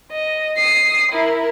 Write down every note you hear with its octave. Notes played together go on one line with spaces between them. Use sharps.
D#5
D#6 C7
E4 A#4